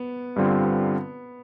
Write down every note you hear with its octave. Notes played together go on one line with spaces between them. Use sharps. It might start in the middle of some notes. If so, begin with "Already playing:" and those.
Already playing: B3
G2 D3 G3 C4 F4